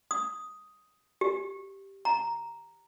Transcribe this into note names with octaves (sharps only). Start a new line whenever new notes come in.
D#6
G4
A#5